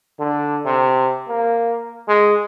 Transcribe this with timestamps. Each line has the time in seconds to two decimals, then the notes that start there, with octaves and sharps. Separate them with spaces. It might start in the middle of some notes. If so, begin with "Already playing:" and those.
0.20 D3
0.65 C3
1.28 A#3
2.08 G#3